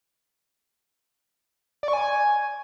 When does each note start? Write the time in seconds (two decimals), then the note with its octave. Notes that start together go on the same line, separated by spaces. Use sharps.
1.83 D5
1.88 C#6
1.93 G#5